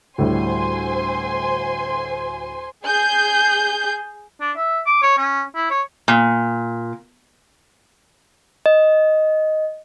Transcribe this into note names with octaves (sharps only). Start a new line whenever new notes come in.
D2 A2 G3 C5 G#5 C6
G#4 G6
D4
E5
D6
C#5
C#4
E4
C#5
A#2
D#5